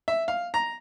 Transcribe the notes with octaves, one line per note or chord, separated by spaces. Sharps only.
E5
F5
A#5